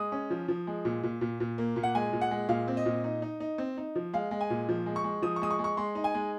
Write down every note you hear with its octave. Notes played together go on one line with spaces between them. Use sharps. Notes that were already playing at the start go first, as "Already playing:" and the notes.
Already playing: G#3 D#6
C#4
F3
F3
G#3
A#2
A#2
A#2
A#2
A#3
A#2
F#5
G#3 G#5
A#2
F#5
G#3
A#2 F5
C4
D#5
A#2
D#4
D#4
D#4
C4
D#4
F3
G#3 F5
G#3
G#5
A#2
F3
G#3
C#6
G#3
F3 D#6
C#6
G#3 D#6
C#6
G#3
C#6
G#3 C6
D#4
G#5
G#3